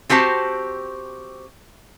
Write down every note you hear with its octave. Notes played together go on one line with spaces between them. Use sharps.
C4 F#4 G4 C5 A5